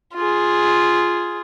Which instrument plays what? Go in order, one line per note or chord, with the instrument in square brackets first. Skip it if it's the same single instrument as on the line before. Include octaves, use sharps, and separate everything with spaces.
[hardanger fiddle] F4 G#4